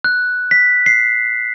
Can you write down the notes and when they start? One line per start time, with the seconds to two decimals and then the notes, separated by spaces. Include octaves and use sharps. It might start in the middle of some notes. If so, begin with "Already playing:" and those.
0.04 F#6
0.51 B6
0.86 C7